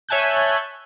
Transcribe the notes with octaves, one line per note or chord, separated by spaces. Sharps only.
C#5 E5 G#5 A5 F#6 G6